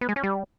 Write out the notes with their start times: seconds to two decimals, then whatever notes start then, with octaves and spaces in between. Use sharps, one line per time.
0.01 B3
0.09 G#3
0.16 C#4
0.23 G3